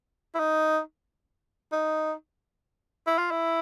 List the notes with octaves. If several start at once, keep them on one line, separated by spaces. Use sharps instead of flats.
E4
D#4
D#4
E4
F4
E4